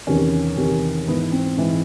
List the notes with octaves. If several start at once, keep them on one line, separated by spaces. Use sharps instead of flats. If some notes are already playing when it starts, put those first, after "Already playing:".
E2 C3 D#3 C#4
E2 C3 D#3
G#2 E3 B3
C4
G#2 E3